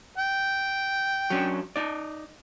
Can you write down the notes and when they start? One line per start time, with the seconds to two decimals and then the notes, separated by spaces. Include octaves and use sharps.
0.18 G5
1.30 F#3 C#4 D4
1.76 D#4 D5